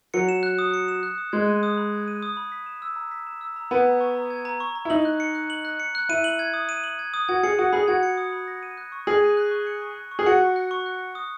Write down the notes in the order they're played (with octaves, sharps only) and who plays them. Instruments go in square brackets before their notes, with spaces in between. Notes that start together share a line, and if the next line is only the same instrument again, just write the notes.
[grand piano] F#3 [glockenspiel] C#7
[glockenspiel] E7
F#6
D#6
C#7
E7
F#6
D#6
[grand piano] G#3 [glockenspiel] G#6
[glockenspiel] D#7
D#6
B5
G#6
D#7
D#6
B5
B6
E7
E6
A#5
B6
E7
E6
A#5
[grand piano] B3 [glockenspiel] G#6
[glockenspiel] A#5
C#6
A#5
G#6
A#5
C#6
A#5
[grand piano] E4
[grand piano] D#4 [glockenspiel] F#7
[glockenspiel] F#6
C#7
F#6
F#7
F#6
C#7
F#6
[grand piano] E4 [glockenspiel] D#7
[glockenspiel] F#7
G#6
D#6
D#7
F#7
G#6
D#6
[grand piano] F#4 [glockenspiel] G#6
[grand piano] G#4 [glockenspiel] C#7
[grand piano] F#4 [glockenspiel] D#6
[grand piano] G#4 [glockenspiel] B5
[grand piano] F#4 [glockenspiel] G#6
[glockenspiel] C#7
D#6
B5
A#6
D#7
F#6
C#6
[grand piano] G#4 [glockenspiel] A#6
[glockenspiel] D#7
F#6
C#6
C#7
C#6
F#6
C#6
[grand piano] G#4
[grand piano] F#4 [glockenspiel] C#7
[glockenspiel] C#6
F#6
C#6
F#6
C#7
D#6